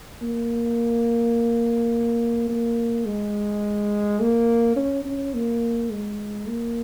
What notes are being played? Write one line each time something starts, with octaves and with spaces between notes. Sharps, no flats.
A#3
A#3
G#3
A#3
C#4
C#4
A#3
G#3
A#3